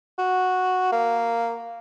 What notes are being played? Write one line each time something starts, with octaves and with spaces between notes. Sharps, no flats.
F#4
A#3